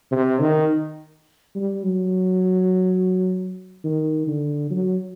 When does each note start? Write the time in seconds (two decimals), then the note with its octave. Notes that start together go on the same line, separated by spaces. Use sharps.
0.11 C3
0.40 D#3
1.55 G3
1.83 F#3
3.84 D#3
4.27 D3
4.70 F#3